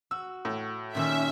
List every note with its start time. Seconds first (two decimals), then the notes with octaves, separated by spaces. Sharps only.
0.11 F#4 E6
0.45 A2
0.95 A#2 D#3 C#4 G4 E5